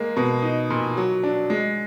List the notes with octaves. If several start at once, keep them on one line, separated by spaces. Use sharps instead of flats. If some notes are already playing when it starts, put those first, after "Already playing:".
Already playing: G#3 A#3
B2
D#4
A#2
F#3
D4
G#3